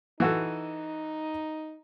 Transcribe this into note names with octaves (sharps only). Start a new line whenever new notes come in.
E3 D#4 F#4 A4